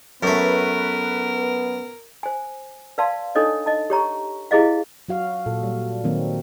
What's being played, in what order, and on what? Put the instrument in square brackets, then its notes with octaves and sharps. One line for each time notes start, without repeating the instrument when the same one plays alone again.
[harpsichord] F#2 A3 [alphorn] B3 [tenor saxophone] A#4 [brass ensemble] B4
[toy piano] C5 G#5
B4 D5 F5 A5 C6
D4 D#4 A4 C#5 D#5
D#5 A5
G4 C#5 A#5 C#6
E4 G4 G#4 C5 D#5 F5
[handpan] F#3 F#4 F5
A#2 A4
G3
D#3 F#3 A#3 C4